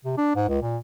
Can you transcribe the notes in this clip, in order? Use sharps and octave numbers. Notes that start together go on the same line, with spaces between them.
C3
D4
G#2
C#2
A#2